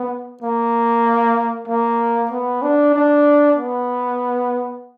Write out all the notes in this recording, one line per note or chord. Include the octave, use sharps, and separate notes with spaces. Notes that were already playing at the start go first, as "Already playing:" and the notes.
Already playing: B3
A#3
A#3
B3
D4
D4
B3